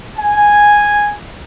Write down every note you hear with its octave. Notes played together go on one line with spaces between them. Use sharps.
G#5